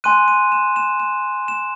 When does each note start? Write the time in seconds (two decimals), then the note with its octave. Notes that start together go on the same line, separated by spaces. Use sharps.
0.04 G#5 C6 F#6 D#7
0.28 D#7
0.52 E7
0.76 E7
1.00 E7
1.48 E7